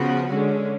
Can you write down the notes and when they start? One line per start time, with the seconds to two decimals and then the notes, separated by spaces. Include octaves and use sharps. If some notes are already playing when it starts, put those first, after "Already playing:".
Already playing: C#3 F3 B3 F#4
0.30 D3 G#3 C#4